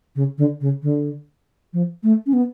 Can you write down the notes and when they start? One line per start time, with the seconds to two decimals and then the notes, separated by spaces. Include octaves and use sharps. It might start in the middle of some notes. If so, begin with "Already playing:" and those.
0.15 C#3
0.38 D3
0.61 C#3
0.83 D3
1.73 F3
2.03 A3
2.26 C#4
2.33 B3